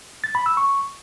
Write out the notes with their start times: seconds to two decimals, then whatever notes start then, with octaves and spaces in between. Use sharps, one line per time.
0.24 A6
0.35 B5
0.46 E6
0.57 C#6